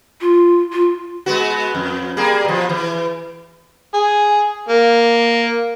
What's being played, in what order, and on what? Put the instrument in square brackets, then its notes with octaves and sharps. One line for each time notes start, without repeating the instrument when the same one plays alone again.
[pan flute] F4
F4
[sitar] G#3 B3 F#4
F2
G3 A#3 G#4
B2 F3
E3
[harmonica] G#4
A#3